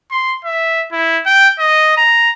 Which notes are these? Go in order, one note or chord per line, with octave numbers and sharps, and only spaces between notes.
C6
E5
E4
G5
D#5
A#5